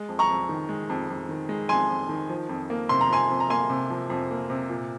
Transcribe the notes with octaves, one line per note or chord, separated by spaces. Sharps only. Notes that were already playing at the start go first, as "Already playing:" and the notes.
Already playing: G#3
F2
A#5 C#6
F2
D#3
G#3
F2
F2
D#3
G#3
F2 G#5 C6
F2
D#3
F3
F2
A#3
C3 C6
A#5
F3 G#5 C6
F2
A#5
A#3 G#5 C6
C3
F3
F2
A#3
C3
A#2